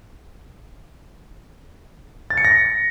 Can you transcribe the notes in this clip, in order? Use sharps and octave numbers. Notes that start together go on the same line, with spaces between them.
A6
C#7
A#6